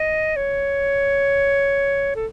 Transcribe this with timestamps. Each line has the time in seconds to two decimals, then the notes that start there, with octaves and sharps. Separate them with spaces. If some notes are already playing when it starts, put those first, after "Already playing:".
Already playing: D#5
0.36 C#5
2.16 A4